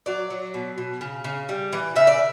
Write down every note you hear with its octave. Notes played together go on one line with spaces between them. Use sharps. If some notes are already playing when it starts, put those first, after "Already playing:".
F#3 D5
F#3
B2
B2
C#3
C#3
G3
E3
C#3 E5
D5